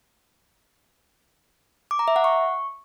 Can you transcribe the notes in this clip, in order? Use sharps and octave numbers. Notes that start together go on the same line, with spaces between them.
D6
A#5
E5
F#5
C#6